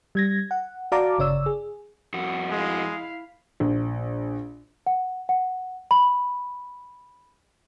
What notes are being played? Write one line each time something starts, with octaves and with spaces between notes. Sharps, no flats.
G3 G#6 A#6
F#5
F#4 D5 F5 A5 A#5 D6
G1 C#3 C#5 D5 E6
G#4
F2 F#4
G#3 E4 F5
A#1
F#5
F#5
B5